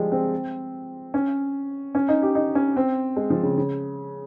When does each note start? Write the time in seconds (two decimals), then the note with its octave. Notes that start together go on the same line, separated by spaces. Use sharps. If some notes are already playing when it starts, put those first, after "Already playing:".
Already playing: F3 G3 G#3
0.12 C4
1.14 C#4
1.95 C#4
2.09 D#4
2.22 G4
2.35 D#4
2.55 C#4
2.76 C4
3.16 G#3
3.30 F3
3.43 C#3
3.57 C#3